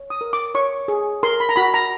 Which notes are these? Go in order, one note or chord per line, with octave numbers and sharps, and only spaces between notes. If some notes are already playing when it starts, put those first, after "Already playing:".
Already playing: C#5
D#6
A#4
D6
C#5 C#6
G#4
A#4 C6
B5
A#5
F#4 B5
A#5